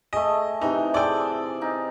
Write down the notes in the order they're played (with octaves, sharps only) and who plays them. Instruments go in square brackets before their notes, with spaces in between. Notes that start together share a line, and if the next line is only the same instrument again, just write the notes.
[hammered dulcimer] A3 G#4 [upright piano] D#5
[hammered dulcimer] C3 E3 [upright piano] D#4
[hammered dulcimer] G#4 A4 C6 [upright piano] D5 G5
[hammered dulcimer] D#4 F5